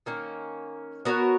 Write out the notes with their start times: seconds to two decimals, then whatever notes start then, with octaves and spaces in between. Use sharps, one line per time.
0.06 D#3 A#3 C#4
1.05 B3 F#4 A#4 C#5